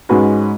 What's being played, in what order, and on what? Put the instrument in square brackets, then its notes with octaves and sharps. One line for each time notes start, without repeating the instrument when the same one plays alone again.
[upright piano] G#2 G#3 C#4 F#4 B4